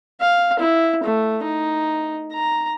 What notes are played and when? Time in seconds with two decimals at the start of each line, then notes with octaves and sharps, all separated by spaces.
0.21 F5
0.60 E4
1.03 A3
1.43 D#4
2.33 A#5